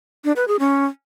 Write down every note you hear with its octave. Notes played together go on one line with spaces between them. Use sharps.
D4
B4
G#4
C#4